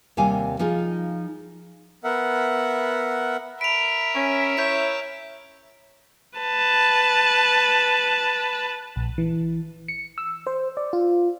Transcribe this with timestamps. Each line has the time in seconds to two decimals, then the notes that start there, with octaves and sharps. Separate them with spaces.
0.17 D#2 C3 G3 F5 G#5
0.59 F3 D#4 F4 G#4
2.04 B3 A#4 E5 F#5
3.61 A#4 E5 B5 D7 F7
4.15 C#4
4.57 E4 C#5 G6 B6 D7
6.38 B4 A5
8.96 A#1
9.18 E3
9.88 C#7
10.18 E6
10.47 C5
10.77 D5
10.93 F4